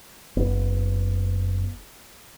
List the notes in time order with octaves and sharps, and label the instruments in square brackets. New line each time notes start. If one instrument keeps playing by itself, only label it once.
[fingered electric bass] F#1 B3